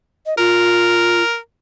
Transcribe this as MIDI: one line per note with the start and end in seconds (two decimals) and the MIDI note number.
0.26 0.34 75
0.38 1.23 65
0.38 1.37 70